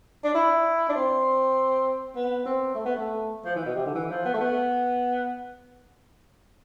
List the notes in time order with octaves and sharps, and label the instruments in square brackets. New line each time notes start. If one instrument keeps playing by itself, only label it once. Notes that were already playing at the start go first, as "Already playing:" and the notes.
[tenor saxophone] D4
E4
D4
C4
B3
C4
A3
B3
A3
F3
E3
B2
C3
D3
E3
F3
B3
A3
B3